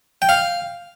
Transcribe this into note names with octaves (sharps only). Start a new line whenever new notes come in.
G5
F5